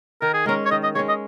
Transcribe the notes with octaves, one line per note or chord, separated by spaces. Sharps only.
D#3 A#4
G#4
G#3 C#4 A#4
C#5
D#3 D#5
D#5
G#3 C#4 C#5
D#5